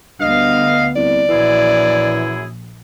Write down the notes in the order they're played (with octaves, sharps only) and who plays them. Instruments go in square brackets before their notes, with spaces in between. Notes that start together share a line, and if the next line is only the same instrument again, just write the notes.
[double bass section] D2 B3 [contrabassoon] G2 [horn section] D#5 F5
[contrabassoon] C2 [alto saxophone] D5
[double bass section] A#1 [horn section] F#2 E4 G#4 [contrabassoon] E3